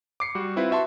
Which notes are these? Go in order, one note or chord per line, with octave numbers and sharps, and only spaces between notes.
D6 C7 C#7
G3 F#4
C4 E4 F4 B4
F#4 E5 A5 C6